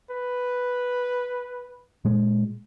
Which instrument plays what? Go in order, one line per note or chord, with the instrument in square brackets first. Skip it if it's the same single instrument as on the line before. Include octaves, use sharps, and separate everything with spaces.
[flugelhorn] B4
[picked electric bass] A#2 G#3